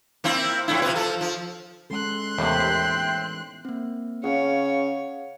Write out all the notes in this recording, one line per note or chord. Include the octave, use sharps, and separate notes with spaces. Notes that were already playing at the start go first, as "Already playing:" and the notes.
A#3 C4 E4
F2 A2 E4
C3 F4 B4
F3 A4
F3
G#3 C#4 A4 C6 F#6
D#2 A2 C3 E3 B3 E5 G5
A#3 C4
C#3 C#5 F5 F#5